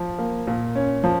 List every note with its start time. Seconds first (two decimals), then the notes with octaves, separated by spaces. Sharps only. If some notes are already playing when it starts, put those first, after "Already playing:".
Already playing: F3
0.19 A#3
0.47 A#2
0.75 C#4
1.04 F3